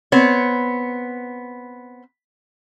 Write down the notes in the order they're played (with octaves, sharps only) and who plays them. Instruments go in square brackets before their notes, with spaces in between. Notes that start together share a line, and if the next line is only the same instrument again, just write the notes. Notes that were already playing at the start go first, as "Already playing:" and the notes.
[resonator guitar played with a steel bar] B3 C4 C#5